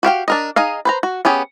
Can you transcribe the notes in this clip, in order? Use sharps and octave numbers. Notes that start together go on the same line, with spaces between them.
F#4 G4 F5 G5
D4 A#4 D#5
D#4 G#4 D#5 F5
B4 C5 A#5
F#4
B3 C#4 G4 G#4